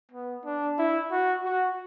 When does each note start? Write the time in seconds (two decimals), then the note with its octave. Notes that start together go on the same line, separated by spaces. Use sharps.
0.11 B3
0.45 D4
0.79 E4
1.11 F#4
1.44 F#4